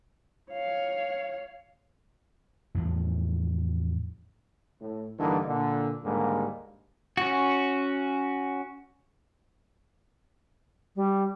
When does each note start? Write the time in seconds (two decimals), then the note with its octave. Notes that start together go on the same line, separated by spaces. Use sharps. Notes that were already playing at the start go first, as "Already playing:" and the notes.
0.51 C#5 F5
2.75 E2 A2 F3
4.81 A2
5.19 G2 D3 E3 A#3 D4 D#4
5.48 A#2 D3
6.04 D#2 G#2 D3 G3 A#3
7.17 C#4 F#4
10.96 G3